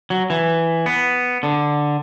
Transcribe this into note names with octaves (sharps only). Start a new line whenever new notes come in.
F#3
E3
B3
D3